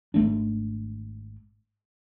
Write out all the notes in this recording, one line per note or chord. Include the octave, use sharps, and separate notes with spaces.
G#1 A3 D4